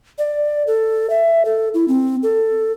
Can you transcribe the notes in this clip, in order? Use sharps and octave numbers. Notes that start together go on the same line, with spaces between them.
D5
A4
E5
A4
E4
C4
A4